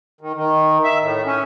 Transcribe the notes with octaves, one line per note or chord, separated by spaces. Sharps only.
D#3
D#3
E5
A2
C#4